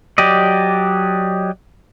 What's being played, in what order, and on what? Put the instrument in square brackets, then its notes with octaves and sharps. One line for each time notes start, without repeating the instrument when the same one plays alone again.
[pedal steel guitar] F#3 G4 D5 D#5